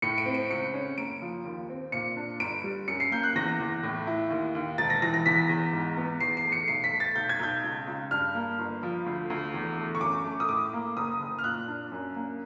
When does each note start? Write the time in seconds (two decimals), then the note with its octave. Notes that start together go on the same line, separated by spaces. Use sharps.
0.02 A2 C#7
0.18 D7
0.26 C4
0.35 D7
0.50 C#2 C#7
0.74 C#4
0.98 F#1 D7
1.22 F3
1.45 D#2
1.70 C4
1.92 A#2 C#7
2.17 D4
2.40 G1 D7
2.64 G3
2.88 F#2 C#7
3.00 C7
3.12 A#3 G6
3.23 F#6
3.35 E2 A#6
3.60 E2
3.83 A2
4.07 E4
4.30 D#2
4.55 D#2
4.78 E1 A6
4.90 A#6
5.02 E3 A#6
5.14 A#6
5.26 E2 B6
5.49 E2
5.73 G#2
5.97 B3
6.21 E2 C7
6.37 C7
6.45 A3
6.52 C#7
6.68 B1 C7
6.84 B6
6.93 A3
7.00 A6
7.16 B1 G6
7.29 G#6
7.40 B1 G6
7.64 C#2
7.87 C#2
8.11 G2 F6
8.35 A#3
8.59 G1
8.83 F3
9.06 D2
9.30 D2
9.54 E2
9.77 A3
9.95 C#6
10.01 F#2 D6
10.25 A3
10.40 D#6
10.49 A2 D6
10.73 A#3
10.97 F#1 D#6
11.20 F#1
11.39 F6
11.44 A#2 F#6
11.68 D4
11.92 F#2
12.16 A#3